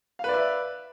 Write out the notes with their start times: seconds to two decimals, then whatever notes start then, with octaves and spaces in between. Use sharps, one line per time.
0.19 F5
0.24 B4
0.29 D5
0.34 E5